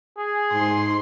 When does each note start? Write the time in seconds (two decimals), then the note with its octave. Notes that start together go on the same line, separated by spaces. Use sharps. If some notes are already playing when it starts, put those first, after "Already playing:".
0.18 G#4
0.53 G#2 C6